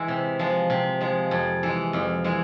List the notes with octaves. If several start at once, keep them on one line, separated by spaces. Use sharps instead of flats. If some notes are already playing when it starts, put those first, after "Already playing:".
Already playing: E3 G#3 E4
C3
F3 G#3
C3
F3 G#3
F2
E3 G#3
F2
E3 G#3